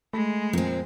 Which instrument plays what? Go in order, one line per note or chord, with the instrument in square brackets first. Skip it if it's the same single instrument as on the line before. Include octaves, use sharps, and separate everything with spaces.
[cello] G#3 [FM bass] A3 [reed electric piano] B5
[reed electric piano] F2 [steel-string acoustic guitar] A#2 C4